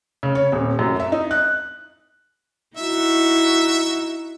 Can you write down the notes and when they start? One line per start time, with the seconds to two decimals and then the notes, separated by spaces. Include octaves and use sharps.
0.23 C#3
0.35 C#5
0.52 D#1
0.79 F#2
1.00 E5
1.12 D#4
1.31 F#6
2.77 D#4 E4 F#4 E5